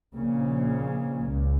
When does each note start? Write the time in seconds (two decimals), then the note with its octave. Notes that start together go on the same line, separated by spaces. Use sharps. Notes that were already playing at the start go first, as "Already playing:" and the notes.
0.15 A#1 A#2 C#3
1.29 C#2